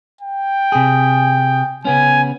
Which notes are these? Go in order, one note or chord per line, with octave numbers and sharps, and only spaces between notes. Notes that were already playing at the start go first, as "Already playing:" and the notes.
G5
C3 G#4
C#3 B3 C#4 G#5